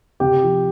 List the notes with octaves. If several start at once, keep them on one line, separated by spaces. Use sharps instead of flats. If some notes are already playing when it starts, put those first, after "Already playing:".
C3 G4 G5
F3